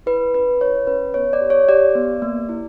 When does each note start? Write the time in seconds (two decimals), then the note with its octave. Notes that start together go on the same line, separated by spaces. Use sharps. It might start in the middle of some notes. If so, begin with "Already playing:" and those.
0.06 E4 B4
0.34 C#4 B4
0.61 E4 C#5
0.87 C#4 B4
1.14 B3 C#5
1.33 D5
1.41 G4
1.50 C#5
1.69 G4 D5
1.95 B3
2.22 A#3
2.49 E4